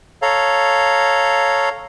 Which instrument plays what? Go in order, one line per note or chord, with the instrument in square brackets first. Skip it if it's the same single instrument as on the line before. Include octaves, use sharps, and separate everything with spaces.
[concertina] A4 C#5 F5 A#5